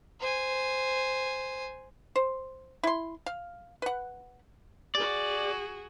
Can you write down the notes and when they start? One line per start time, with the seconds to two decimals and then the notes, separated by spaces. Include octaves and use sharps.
0.20 C5 G#5
2.16 C5
2.83 E4 C6
3.26 F5
3.82 B4 F#5
4.95 F#4 G#4 D5